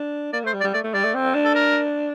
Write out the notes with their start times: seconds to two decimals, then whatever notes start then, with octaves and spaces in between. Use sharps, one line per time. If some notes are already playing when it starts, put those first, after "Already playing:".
Already playing: D4
0.33 A#3 D5
0.43 A3 C5
0.54 G3
0.60 D5
0.64 G3
0.74 A3 D5
0.84 A3
0.94 G3 D5
1.04 A3
1.14 C4
1.34 D4
1.45 A4
1.55 A#4